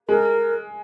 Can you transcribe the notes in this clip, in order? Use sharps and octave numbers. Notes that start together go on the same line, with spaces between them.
G#3 A#4